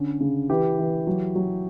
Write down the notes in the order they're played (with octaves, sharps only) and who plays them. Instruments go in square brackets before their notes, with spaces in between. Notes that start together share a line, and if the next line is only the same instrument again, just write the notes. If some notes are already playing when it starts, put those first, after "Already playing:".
Already playing: [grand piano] D3 C#4
C#3
E3 G4
E3
F#3
F#3